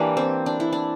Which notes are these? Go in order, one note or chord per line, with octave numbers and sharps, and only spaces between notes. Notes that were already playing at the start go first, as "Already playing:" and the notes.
Already playing: E3 G3 A#3 D4 E4 G4
C4
D4
E4
D4